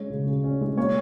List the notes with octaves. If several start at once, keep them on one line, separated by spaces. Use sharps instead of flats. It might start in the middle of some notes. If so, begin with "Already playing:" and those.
Already playing: G#3 C#4 C#5
C#3
C#3
C#4
G#3
A#3 C#5